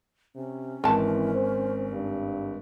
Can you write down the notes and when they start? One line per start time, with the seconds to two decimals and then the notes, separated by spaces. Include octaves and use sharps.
0.36 C3 C#4
0.84 G#1 E3 C4 A5
1.34 C5
1.93 G2